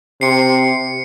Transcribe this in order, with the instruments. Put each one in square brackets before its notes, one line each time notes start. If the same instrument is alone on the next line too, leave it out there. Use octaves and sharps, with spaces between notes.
[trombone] C3 [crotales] C7 C#7